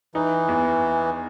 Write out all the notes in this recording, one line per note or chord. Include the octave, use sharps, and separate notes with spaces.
E3 D#4
E2